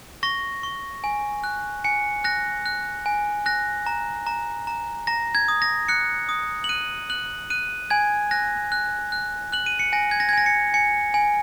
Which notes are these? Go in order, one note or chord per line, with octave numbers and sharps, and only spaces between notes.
C#6 A#6
C#6
G#5
F#6
G#5 C#7
F#6 A#6
F#6
G#5
F#6 A#6
A#5
A#5
A#5
A#5 A#6
G#6
D#6
A#6
F#6 C#7
D#6
F#7
F#6 D#7
F#6 F#7
F#6 D#7
G#5 G#6
F#6 A#6
F#6
F#6
F#6 F#7
D#7
C#7
G#5 A#6
G#6
A#6
G#6
G#5 A#6
C#7
G#5 C#7
G#5